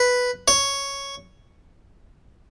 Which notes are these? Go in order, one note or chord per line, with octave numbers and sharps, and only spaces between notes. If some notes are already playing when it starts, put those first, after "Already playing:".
Already playing: B4
C#5